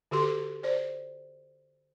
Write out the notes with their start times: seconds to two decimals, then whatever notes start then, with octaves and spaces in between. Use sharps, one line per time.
0.11 D3 F#4 G4 A4 C6
0.63 C5 D5